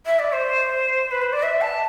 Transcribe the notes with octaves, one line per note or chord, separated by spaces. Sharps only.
E5
D5
C5
B4
C5
D5
E5
A5